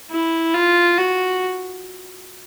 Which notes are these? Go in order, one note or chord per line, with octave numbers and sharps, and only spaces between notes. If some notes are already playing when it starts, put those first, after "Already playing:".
E4
F4
F#4